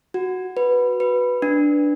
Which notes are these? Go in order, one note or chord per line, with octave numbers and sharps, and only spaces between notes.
F#4
B4
B4
D4